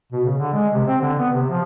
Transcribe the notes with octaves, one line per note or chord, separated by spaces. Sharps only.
B2
C#3
D3
G#3
C3
C4
D3
B3
C3
F3